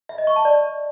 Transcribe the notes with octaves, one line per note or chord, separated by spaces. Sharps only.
E5
D#5
C#6
A5
D5